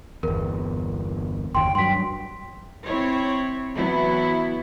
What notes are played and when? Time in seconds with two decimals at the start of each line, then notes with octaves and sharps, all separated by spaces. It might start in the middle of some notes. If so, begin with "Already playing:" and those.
0.23 G1 E2 A#4
1.55 F#1 D#2 G5 C6
1.75 G2 F#3 G5 C6 B6
2.86 C4 E4 C#5
3.75 E3 F#3 B3 E4